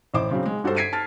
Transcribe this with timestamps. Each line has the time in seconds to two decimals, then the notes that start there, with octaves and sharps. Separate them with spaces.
0.14 A1 E4 C5 D6
0.31 C#3 F#3 C4
0.45 G#3
0.64 G2 F#4 G4 A4 C5
0.76 G#6 B6 C7 D7 D#7
0.93 A5 F6 A6